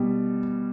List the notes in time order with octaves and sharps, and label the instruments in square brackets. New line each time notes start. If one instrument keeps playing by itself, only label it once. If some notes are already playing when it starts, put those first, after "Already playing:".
Already playing: [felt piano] B2 G3